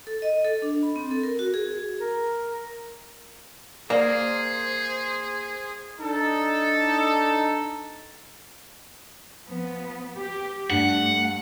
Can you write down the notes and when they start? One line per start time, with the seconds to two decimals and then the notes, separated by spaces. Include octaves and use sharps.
0.07 A4
0.22 D#5
0.45 A4
0.62 D4
0.83 B5
0.96 C4
1.11 A4
1.23 A#4
1.39 F#4
1.54 G#4
2.01 A#4
3.90 A#3 G#4 C5 D5
6.00 D4 D#4 A4
9.47 F3 B3
10.16 G4
10.70 G2 A3 F#5